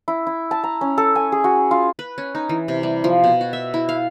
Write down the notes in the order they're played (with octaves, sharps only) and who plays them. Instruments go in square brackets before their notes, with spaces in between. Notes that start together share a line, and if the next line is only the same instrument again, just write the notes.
[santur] E4
E4
A5
A#5
C#4
A4
G#5
G#4
F#4
F4
[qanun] B4
C#4
D#4
E3
C3
G3
F3
B2
F#4
E5
E4
F5